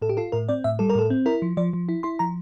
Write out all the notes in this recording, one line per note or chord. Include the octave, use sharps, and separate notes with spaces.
A2 A4
G4
F4 A4
A2 A#4
C4 D5
A2 E5
G3 A4
A#4
A2 A4
C4
E4 A#4
F3
F3 D5
F3
E4
E4 C6
F3 A#5